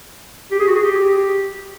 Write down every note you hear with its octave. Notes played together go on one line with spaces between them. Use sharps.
G4
G#4
F#4
G#4
G4